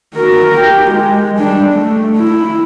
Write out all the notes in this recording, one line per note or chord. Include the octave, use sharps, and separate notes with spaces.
F#4 A#4
G4
G#3
G3 D4
A3
E4